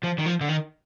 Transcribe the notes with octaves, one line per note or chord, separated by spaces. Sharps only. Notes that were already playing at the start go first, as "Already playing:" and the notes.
F3
D#3
F3
D3
D#3